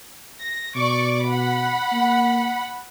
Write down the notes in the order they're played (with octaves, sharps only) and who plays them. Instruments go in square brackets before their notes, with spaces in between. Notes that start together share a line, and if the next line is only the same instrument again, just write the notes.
[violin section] A#6
[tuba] B2 [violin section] D5 C#6 D6
[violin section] F#5 B5
[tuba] A#3